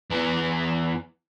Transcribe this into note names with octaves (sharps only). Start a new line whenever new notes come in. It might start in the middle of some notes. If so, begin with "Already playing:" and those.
E2 E3